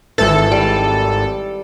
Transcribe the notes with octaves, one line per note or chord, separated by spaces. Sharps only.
G#1 E3 A4
G3